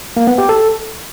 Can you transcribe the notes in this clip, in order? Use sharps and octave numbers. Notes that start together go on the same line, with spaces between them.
A#3
B3
G4
A4